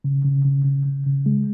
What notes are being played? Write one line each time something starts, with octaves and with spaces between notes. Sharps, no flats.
C#3
C#3
C#3
C#3
C#3
C#3
G#3